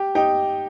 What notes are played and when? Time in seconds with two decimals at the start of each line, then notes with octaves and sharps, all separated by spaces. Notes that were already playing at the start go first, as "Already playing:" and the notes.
Already playing: G4
0.15 D#4 G4